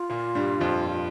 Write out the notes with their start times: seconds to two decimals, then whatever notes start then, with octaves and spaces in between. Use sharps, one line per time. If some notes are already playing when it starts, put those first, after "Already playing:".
Already playing: F4
0.10 A#2 A#3
0.35 G2 G3
0.60 F2 F3